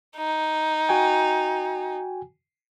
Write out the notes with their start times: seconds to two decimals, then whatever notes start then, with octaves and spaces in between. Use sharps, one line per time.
0.17 D#4
0.89 F#4 G5 G#5